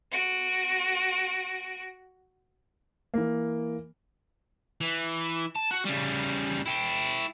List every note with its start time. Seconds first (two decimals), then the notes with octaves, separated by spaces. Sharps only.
0.12 F#4 D7
3.14 E3 A#3
4.81 E3
5.56 A5
5.71 F#4
5.86 C#3 G3
6.66 E4 G5